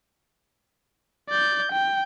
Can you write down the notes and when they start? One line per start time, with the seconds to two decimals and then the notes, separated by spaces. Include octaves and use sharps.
1.30 D5 G6
1.72 G5